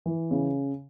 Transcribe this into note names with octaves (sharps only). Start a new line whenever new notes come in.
E3
C#3